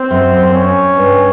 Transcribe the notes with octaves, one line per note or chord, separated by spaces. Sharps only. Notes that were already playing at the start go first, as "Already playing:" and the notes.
Already playing: C4
F#2
C#4
G2